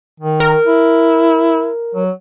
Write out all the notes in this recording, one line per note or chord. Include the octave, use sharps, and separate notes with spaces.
D#3
A#4
E4
F#3